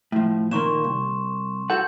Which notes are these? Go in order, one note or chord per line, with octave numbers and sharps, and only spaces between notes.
A2 F3
A#2 D#3 A#3 C6 C#6 E7
C2
F#4 A4 F#5 G6